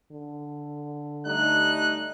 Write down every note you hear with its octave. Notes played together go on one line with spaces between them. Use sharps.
D3
G3 A3 D#4 F#6